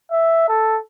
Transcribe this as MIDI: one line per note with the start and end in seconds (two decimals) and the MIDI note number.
0.11 0.45 76
0.48 0.78 69